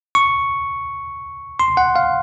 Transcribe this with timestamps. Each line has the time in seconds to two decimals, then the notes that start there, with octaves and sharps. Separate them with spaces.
0.15 C#6
1.59 C6
1.77 F#5
1.96 F5